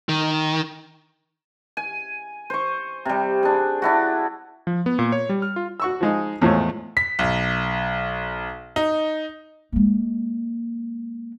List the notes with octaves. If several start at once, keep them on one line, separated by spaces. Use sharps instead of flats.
D#3
G#5
C5 C#6
C3 G3
D4 G#4
D4 E4 F#4
F3
B3
A#2
C#5
G3
F6
F4
F#4 C#6 E6
F3 G#3 D#4
E2 A2 F3 G#3 A3 C#5
B6
B1
D#4
G#3 A#3